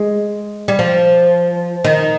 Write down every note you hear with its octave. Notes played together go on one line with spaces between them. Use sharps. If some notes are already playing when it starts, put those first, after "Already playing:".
Already playing: G#3
G3
F3
D#3